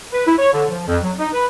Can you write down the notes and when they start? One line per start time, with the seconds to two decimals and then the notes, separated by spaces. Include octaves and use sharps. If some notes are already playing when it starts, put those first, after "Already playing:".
0.12 B4
0.27 E4
0.39 C#5
0.53 D3
0.70 F3
0.88 F2
1.03 F#3
1.19 D#4
1.34 B4